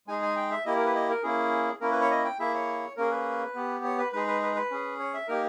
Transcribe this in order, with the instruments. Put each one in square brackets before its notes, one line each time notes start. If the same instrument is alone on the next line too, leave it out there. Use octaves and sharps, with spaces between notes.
[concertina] G#3 D#4 G#4 G#5
G#5
G5
E5
A#3 E4 G4 D#5
A#4
B4
D#5
A#4
A#3 C#4 E4 G#4
A#3 C#4 E4 A#4
B4
C#5
D#5
G5
A#3 E4 G#4 E5
C#5
A#3 C#4 G#4 A#4
B4
B3 G4
C#5
B4
G#3 D#4 G#4 B4
B4
B4
B4
C#4 G#4
C#5
E5
A#3 D#4 G4 A#4